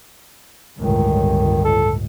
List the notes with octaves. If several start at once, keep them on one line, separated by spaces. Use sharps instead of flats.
G1 C#2 A2 D#3
A4